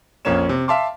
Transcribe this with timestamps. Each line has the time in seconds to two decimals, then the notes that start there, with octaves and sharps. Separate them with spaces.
0.25 A#1 F2 A#3 C#4 C#5 E7
0.49 C3
0.68 E5 F5 A5 C6 D6